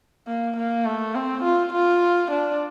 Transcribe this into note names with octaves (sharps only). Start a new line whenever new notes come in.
A#3
A#3
A3
C4
F4
F4
D4